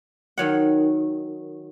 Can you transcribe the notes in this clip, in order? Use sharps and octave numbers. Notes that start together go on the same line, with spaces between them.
D#3 F#3 F#5